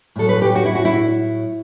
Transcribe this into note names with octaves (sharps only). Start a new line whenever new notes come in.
A2 F#3 A4
B4
G4
F#4
E4
F#4
E4